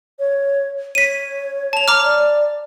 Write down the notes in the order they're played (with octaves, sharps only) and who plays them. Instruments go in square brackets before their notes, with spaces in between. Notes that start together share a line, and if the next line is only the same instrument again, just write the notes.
[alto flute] C#5
[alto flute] C#5 [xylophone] B6 D#7
[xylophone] A5 F7
A#5 D6 F6
[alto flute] D5